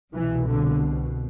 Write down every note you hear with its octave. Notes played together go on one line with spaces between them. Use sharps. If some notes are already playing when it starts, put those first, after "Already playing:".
C2 B2 E3
D3